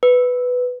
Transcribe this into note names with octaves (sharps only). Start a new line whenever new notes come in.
B4